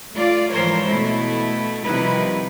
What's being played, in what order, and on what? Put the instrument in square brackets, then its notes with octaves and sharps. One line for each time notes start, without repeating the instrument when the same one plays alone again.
[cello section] A3 F4 D5
G#2 E3 F3 A#4 C5 C#5
B2 A3 E4
C3 D#3 F3 G3 E4 B4